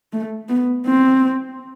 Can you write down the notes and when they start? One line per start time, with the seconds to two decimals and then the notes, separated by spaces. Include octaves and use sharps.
0.13 A3
0.49 B3
0.85 C4